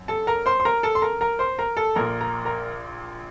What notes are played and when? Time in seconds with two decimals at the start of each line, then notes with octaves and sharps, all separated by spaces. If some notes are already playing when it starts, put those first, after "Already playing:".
Already playing: F#2
0.08 A4 A5
0.27 A#4 A#5
0.46 C5 C6
0.60 C6
0.65 A#4 A#5
0.83 A4 A5
0.95 C6
1.02 A#4 A#5
1.21 A#4 A#5
1.39 C5 C6
1.59 A#4 A#5
1.77 A4 A5
1.95 A#1 A#2 A#4 A#5
2.21 A#4 A#5
2.45 A#4 A#5